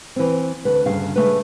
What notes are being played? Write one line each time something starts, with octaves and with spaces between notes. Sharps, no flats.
E3 C4
D2 B4
D2 G2 C#3 F5
C#3 A3 B4